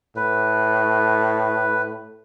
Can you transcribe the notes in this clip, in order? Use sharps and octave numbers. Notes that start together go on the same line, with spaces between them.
A2 B4